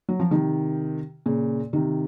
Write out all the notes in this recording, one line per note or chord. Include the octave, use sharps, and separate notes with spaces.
F#3
F3
C3 D#3
A#2 C#3
C3 D#3